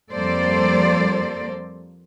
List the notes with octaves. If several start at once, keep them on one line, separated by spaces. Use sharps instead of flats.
F2 G3 A#3 A4 C5 D5